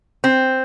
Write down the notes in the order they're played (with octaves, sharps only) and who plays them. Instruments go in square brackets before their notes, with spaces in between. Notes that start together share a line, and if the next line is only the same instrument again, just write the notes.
[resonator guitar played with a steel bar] C4